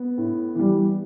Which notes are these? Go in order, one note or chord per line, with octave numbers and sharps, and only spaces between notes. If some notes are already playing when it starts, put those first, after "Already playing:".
Already playing: B3
A2
E3 G3